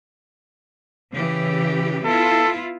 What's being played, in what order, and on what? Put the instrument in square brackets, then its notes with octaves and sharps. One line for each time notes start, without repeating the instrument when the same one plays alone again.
[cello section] C#3 E3 G4
[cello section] B3 E4 F4 [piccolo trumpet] A4